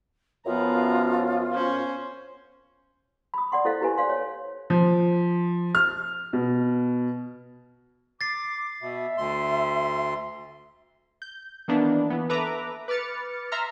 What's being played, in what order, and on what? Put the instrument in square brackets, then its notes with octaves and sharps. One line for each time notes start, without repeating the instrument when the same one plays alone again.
[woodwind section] F#2 F3 [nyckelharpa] B3 A#5 [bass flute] F4
[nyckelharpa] C#4 C5
[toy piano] B5 D#6
D5 F#5 C6
E4 A4 C5 D#5 F5
E4 G4 B4 F5 G#5
C5 D5 F5 C6
C#5
[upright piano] F3
F6
B2
[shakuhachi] D6 [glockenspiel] A6 C7
[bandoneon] B2 [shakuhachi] E5
[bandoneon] D2 C6
[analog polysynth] G6
D#3 E3 A#3 B3 D4
E3 B3
A4 B4 E5 A#5 D6
B4 D6 F6 A6 C#7
E5 A#5 C6 F6